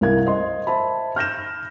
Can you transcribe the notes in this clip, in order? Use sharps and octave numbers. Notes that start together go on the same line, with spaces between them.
C2 E4 A#4 F5 G#6
C5 D#5 C6
C5 E5 A5 B5
F6 G6 A#6 E7